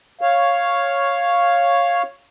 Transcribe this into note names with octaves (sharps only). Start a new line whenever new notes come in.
C#5 F5